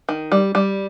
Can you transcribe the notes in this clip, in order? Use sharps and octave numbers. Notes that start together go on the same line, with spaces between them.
D#3
G3
G3